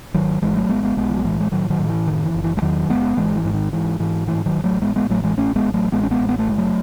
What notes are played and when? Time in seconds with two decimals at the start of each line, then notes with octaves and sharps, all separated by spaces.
0.14 G#1 D#3 F#3
0.42 G#1 E3 G#3
0.55 F#3 A3
0.69 G#1 G#3 B3
0.83 G#3 B3
0.97 B1 G#3 B3
1.10 E3
1.17 F#3
1.24 A2 E3 G#3
1.40 G#3
1.52 A2 D#3 F#3
1.70 D#3 F#3
1.79 A2
1.89 E3
2.06 F#1 D#3
2.25 E3
2.34 F#1
2.44 E3
2.57 G#3
2.62 E2 D#3 F#3
2.89 F#1 G#3 B3
3.17 G#1 E3 G#3
3.36 E3
3.45 G#2
3.54 D#3
3.72 G#2 E3
3.99 G#2 E3
4.27 A2 E3
4.46 D#3 F#3
4.55 A1
4.64 F#3 A3
4.82 A2 G#3 B3
4.96 G#3 B3
5.10 A1 F#3 A3
5.23 E3 G#3
5.37 A1 A3 C#4
5.56 G#3 B3
5.65 A1
5.74 F#3 A3
5.92 A1 G#3 B3
6.03 C#4
6.11 G#3 B3
6.20 A1
6.29 B3
6.39 A3
6.48 F#1 G#3
6.58 F#3 A3